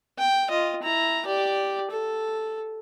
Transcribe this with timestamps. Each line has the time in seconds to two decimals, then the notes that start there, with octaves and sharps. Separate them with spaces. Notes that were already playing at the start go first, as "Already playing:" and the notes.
0.18 G5
0.50 F4 D#5
0.82 E4 A#5
1.26 G4 D5
1.91 A4